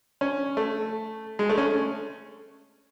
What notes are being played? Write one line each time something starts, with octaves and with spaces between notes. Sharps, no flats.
C#4
A3
G#3
A3
C#4